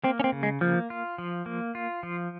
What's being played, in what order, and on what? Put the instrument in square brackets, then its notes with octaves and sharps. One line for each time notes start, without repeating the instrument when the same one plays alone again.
[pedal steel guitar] A#3 [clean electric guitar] C4
[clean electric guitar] C#4
C4
[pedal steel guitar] C#3
[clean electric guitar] G#3
[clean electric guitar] F3 [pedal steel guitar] A#3
[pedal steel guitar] F4
F3
A#3
F4
F3